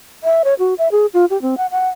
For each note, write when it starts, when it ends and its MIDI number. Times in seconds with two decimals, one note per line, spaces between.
0.24 0.42 76
0.44 0.54 73
0.59 0.74 66
0.78 0.88 76
0.92 1.06 68
1.14 1.25 65
1.30 1.40 67
1.42 1.57 60
1.57 1.66 78
1.71 1.89 78